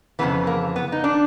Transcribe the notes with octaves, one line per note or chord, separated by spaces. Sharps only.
F2 C#3 E3 B3
A#3
B3
D#4
D4